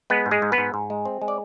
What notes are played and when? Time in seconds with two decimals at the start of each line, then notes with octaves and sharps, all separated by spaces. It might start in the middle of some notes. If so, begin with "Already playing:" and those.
0.10 G#3 B3 B4
0.26 G#2
0.31 G#3 G#4
0.42 G#2
0.52 B3 B4
0.58 G#2
0.74 G#2
0.90 G#3
1.05 C4
1.22 G#3
1.28 D5